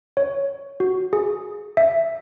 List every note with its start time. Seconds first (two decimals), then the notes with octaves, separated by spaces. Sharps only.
0.17 C#5
0.80 F#4
1.13 G#4
1.77 E5